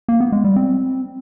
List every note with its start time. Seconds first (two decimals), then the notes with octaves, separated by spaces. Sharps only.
0.08 A#3
0.20 B3
0.32 G#3
0.44 G3
0.56 C4